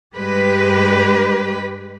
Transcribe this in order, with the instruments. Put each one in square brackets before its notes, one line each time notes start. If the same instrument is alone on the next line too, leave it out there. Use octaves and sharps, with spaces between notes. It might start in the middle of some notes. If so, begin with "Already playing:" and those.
[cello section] G2 G#3 G4 B4